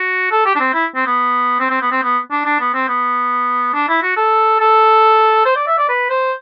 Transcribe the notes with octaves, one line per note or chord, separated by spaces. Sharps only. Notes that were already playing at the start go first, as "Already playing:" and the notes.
Already playing: F#4
A4
G4
D4
C4
E4
C4
B3
C4
C4
B3
C4
B3
D4
D4
B3
C4
B3
D4
E4
F#4
A4
A4
C5
D5
E5
D5
B4
C5